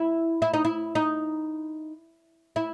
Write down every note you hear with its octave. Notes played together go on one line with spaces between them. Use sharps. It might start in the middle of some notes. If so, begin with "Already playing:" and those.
Already playing: E4
E4
D#4
E4
D#4
E4